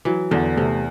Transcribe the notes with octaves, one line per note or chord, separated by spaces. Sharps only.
E3 F#3
E2 D3
C3 A3